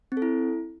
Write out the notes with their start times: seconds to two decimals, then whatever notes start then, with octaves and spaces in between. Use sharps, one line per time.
0.12 C4
0.17 A4
0.22 E4